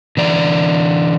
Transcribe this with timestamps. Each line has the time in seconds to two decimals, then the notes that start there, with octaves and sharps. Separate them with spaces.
0.17 D3 E3 D5 A#5